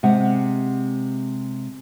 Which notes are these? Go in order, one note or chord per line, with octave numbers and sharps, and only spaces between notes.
C3 G#3 F#5